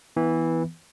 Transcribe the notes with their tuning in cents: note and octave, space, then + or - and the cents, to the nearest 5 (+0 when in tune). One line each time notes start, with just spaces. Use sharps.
E3 -10 B3 +0